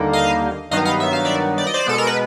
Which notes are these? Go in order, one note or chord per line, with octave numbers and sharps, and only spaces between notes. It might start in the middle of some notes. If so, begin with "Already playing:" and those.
Already playing: D#2 D3 G3 A#3 D#4
D#5 F5
G2 D#3 F#3 B3 D#4 D#5 F5
D#5 F5
E5
F5
D5 E5
D5
D#5
C5 D5
B2 G#3 B3 A4
A#4
B4